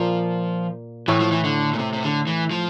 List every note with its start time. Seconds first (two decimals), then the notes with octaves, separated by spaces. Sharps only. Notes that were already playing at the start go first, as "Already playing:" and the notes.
Already playing: A#2 F3 A#3
1.08 A2 E3 A3
1.20 F3
1.32 E3
1.44 D3
1.73 A#2
1.79 C3
1.93 C3
2.03 D3
2.27 E3
2.51 F3